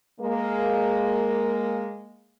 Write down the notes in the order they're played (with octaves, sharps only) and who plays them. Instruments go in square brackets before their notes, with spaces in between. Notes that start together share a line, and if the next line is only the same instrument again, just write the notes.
[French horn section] G#3 A#3